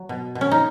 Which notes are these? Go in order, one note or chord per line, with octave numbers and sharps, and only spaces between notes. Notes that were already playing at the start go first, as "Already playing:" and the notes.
Already playing: F#3
B2
B2
C#4
D#4